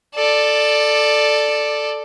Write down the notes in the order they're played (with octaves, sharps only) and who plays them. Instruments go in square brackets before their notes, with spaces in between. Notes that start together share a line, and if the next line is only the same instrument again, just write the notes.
[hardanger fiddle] A4 D5